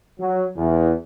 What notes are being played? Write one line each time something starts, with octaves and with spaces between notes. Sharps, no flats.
F#3
E2